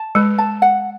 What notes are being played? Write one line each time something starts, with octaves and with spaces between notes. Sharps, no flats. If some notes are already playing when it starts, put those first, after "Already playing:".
Already playing: A5
G#3 B4
A5
F#5